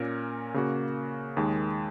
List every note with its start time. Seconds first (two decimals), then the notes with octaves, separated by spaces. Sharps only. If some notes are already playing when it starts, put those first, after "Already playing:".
Already playing: A#2 A#3 C#4 A#4
0.54 C#3 A#3 F#4
1.37 D#2 D#3 G#3